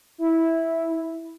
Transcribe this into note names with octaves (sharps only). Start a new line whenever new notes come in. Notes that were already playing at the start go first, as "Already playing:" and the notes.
E4